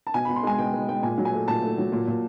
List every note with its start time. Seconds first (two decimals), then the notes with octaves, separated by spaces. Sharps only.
0.07 A5
0.14 B2 G#5
0.25 B2 B5
0.36 C6
0.43 G#3 G#5
0.58 B2 G5
0.73 G#3
0.88 G#3 G5
1.03 A#2 G#5
1.18 F#3
1.25 G#5
1.33 A3
1.48 A#2 A5
1.62 A3
1.78 F#3
1.92 A#2
2.07 A#2